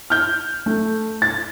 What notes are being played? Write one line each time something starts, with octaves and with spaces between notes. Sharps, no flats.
F6 G6
A3
A6